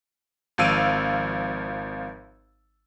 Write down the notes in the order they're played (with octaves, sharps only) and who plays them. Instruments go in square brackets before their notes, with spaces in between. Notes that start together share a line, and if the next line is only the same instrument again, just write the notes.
[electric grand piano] G#1 F3 F5 E6 D7 D#7